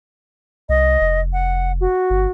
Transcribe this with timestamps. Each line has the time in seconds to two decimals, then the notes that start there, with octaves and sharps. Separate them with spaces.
0.69 C2 D#5
1.01 F1
1.33 F#5
1.81 F#4
2.10 G1